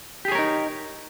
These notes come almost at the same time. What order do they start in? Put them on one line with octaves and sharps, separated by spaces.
G4 G#4 C#5 A#4 D#4